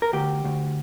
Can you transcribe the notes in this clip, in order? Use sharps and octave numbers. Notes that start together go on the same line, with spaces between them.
A#4
D2 G4
D2